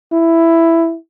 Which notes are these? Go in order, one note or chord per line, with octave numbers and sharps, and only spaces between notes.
E4